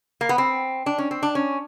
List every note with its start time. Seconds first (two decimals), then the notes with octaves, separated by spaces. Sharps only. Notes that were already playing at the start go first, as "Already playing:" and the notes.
0.21 A#3
0.29 B3
0.38 C4
0.86 D4
0.98 C#4
1.11 C4
1.23 D4
1.35 C#4